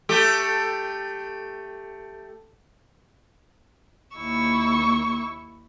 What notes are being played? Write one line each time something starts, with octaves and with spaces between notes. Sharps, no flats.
A3 G4
D#2 E4 C#6 E6